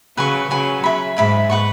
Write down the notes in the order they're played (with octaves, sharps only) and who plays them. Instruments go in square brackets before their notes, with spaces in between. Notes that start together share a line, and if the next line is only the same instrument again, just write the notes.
[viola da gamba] C#3 F#3 [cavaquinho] B4 G#5 C#6
[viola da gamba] C#3 F#3 [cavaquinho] B4 G#5 C#6
[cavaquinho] G#4 E5 B5
[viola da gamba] G#2 [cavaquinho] G#4 E5 B5
[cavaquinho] B4 F#5 C#6